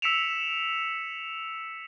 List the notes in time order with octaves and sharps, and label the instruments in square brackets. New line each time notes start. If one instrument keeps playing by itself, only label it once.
[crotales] E6 B6 C#7 D7 E7 F7